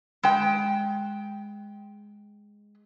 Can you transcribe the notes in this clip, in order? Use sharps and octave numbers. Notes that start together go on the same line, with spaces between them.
G#3 G5